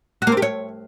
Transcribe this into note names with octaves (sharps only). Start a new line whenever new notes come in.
F#4
A#3
C4
G4
C#5